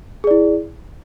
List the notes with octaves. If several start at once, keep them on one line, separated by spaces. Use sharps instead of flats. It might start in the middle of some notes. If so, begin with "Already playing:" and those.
E4 G#4 D5